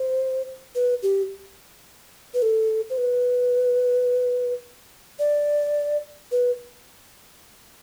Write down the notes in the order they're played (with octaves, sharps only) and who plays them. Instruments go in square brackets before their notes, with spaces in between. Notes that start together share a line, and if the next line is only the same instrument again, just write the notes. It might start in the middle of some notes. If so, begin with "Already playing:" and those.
Already playing: [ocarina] C5
B4
G4
B4
A4
C5
B4
D5
B4